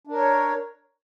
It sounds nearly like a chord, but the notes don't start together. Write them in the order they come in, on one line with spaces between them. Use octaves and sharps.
D4 A#4 C#5